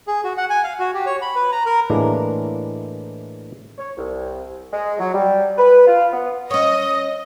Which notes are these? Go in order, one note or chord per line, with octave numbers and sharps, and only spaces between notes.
G#4
F#4
F#5
G#5
F5
F#4
G4
C#5
B5
B4
A#5
A#4
A2 E3 G#3 A#3 D4
C#5
C2
G#3
F#3
G3
B4
F4
B3
C#4 C#5 D#5 D#6